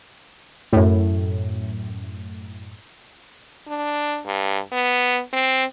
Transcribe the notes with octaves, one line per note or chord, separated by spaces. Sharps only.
F#2 A2
D4
G2
B3
C4